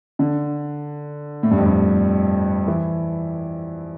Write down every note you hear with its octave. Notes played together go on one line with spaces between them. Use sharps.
D3
A2
G2
F2
G2
E3